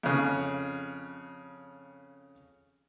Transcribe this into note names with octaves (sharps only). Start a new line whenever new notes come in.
F2 C#3